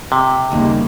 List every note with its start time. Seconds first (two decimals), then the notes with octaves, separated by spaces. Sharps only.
0.12 C3
0.52 D#2 C#3 G3 A#3